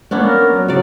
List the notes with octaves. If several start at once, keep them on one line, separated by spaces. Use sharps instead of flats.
A#3 B3 C#4 D4
A#4
F#3
C#3 F#3 D5